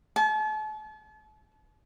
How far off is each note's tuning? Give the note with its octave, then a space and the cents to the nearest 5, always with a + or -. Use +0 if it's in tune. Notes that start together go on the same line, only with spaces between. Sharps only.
A5 -40